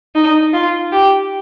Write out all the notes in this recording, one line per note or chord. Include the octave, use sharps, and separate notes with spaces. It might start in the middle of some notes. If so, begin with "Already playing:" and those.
D#4
F4
G4